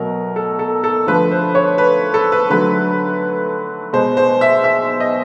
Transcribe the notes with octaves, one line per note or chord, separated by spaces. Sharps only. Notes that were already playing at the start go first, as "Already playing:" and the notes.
Already playing: B2 F#3 A3 A#4
A4
A4
A4
D3 F3 A3 B4
C5
C#5
B4
A4
B4
D3 F#3 A3 B4
B2 G#3 C5
C5
E5
E5
D#5